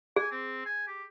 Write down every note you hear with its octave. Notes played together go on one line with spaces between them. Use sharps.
G#4 G#5
C4
G#5
G4